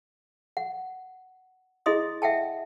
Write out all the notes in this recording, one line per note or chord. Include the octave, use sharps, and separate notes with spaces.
F#5
E4 G#4 D#5 C6 D#6
E5 F#5 G5 A5